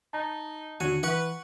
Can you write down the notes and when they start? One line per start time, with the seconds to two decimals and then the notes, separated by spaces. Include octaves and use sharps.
0.13 D#4 A5 A#5
0.80 D#2 D3 D4 F#4 G#5
1.03 E3 B4 F#5 C#6